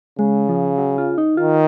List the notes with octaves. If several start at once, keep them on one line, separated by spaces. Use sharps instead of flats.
C#3 G#3
F3
F#3
F4
D#4
D#3 F4